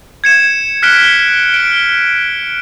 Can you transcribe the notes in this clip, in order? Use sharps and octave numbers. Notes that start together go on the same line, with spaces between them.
G#6 C#7 E7
F6 F#6 B6 C#7 D7 G7
D7 G7